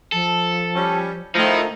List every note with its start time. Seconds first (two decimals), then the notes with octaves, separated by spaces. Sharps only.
0.12 F3 A4
0.76 G3 C#4
1.35 D#3 F3 A3 D#4 E4